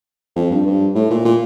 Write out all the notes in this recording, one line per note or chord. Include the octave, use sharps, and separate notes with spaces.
F2
G2
G2
A2
A#2
A#2